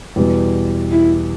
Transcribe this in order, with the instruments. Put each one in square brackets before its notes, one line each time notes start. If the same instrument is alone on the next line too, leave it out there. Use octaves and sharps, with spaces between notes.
[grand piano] E2 B2 G3 B3
[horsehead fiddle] E4